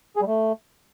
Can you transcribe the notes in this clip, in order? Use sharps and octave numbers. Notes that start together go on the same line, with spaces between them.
G#4
G3
A3